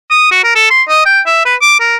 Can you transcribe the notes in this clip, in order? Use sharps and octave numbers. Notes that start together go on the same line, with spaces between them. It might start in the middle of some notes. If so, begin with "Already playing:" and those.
D#6
F#4
A#4
A4
C6
D#5
G5
E5
B4
D6
A#4